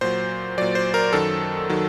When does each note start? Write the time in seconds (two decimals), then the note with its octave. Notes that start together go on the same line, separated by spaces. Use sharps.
0.01 A#2 F#3 C5
0.58 A#2 F#3 D5
0.75 C5
0.94 A#4
1.13 F#2 D#3 F#3 A4
1.70 D#3 F#3